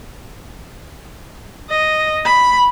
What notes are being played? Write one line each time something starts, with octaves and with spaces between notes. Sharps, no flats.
D#5
B5